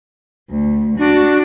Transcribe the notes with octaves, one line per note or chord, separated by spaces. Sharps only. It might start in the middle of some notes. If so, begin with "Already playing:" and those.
D2
D4 F#4